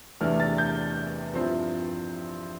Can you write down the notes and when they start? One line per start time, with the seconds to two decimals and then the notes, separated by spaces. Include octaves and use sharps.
0.21 E2 C3 E3 A3 D4 F6
0.40 A6
0.58 G6
1.33 G2 F3 C4 E4